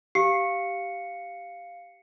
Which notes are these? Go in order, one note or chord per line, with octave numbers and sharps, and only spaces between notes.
G4 F5 C7 C#7